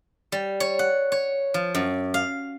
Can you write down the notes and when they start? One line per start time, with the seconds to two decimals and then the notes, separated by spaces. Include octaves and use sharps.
0.32 G3
0.60 C#5
0.79 F#5
1.12 C#5
1.54 F3
1.75 F#2
2.14 F5